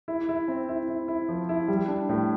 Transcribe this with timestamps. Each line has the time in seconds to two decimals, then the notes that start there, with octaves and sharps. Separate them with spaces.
0.08 E4
0.29 E4
0.48 C4
0.69 E4
0.89 E4
1.08 E4
1.29 F3
1.49 E4
1.68 G3
1.88 D4
2.09 A2